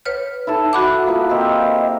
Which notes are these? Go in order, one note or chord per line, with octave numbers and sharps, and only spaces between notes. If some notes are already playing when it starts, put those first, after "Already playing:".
B4 C#5 F6
D#4 E4 A4 A5
F#4 F#5 B5 D6
A#3 B3 F4 B4
A#3 C4 G4 D#5